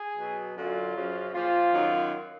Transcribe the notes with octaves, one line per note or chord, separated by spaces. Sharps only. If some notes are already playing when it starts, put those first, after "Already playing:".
Already playing: G#4
B2 F#3
F#2 D3 F#3 F4
F#2 C#3 F3
A#2 F3 F4
F#2 D#3 F#3